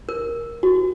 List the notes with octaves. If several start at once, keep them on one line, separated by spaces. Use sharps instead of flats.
A#4
F#4